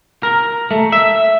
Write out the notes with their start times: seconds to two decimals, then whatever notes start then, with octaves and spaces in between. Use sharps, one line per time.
0.23 A#4
0.71 A3
0.92 E5